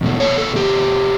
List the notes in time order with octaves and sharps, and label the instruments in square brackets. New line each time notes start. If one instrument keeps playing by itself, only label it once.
[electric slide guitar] E2 B2 A3
C#5
A4
G4